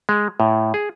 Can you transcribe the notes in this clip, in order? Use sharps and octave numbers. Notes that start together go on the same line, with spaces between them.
G#3
A2
G#4